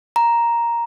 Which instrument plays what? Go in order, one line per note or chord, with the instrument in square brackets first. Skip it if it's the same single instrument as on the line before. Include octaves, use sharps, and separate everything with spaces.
[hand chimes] A#5